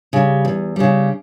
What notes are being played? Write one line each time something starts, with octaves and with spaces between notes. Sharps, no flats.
C#3 G3
E2
C#3 G3